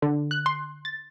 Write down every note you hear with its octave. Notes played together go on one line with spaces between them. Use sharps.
D3
F#6
C6
A6